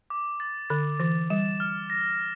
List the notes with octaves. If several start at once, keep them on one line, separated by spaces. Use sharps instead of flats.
D6
A6
D3 A6
E3 D6
G3 E7
F6
A#6